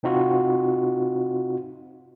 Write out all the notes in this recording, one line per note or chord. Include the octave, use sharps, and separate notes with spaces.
C3 C4 D#4 F4 F#4